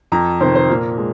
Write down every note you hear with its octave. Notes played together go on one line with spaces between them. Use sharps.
F2 A#5
C3 D#3 C5
C5
A#2 A#4
G#3